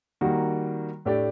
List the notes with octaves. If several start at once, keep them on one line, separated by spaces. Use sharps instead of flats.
D#3 G3 A#3 F#4
A2 A3 D4 G4 D5